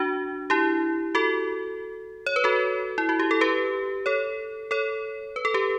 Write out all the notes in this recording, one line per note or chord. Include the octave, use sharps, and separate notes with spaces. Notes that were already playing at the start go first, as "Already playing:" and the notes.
Already playing: D4 F#4
E4 G4
F#4 A4
C#5
B4
F#4 A4
E4
F#4
G4
A4
G4 B4
A4 C#5
A4 C#5
B4
A4
G4 B4